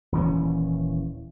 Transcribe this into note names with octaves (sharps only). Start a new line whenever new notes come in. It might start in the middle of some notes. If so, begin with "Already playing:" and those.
D#1 E3 C4 C#4